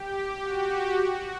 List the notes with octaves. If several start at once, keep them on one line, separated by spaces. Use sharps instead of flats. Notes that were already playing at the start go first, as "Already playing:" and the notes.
Already playing: G4
F#4
F#4